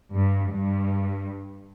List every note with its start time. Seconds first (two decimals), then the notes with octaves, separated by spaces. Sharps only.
0.17 G2
0.53 G2